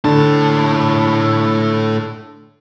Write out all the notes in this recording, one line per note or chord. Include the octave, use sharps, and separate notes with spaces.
A2 D3 A5